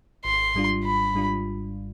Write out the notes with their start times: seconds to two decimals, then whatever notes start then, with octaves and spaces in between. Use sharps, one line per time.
0.25 G#1 C6
0.55 G#2 G3 D4 F4
0.84 G#1 B5
1.14 G#2 G3 D4 F4